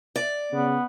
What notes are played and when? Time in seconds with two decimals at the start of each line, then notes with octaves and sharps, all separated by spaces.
0.16 D5
0.52 C#3 B3